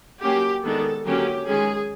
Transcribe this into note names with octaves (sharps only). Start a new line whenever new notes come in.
F#3 A#3 C#4 G4
D#3 G#3 B3 D4 A4
D3 F#3 A#3 C#4 G4
D#3 G#3 C#4 G#4